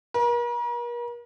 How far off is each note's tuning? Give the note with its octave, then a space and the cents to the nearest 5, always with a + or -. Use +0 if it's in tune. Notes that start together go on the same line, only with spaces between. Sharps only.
A#4 +40